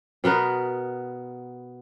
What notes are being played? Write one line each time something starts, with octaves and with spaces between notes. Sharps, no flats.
B2 B3 A#4 B4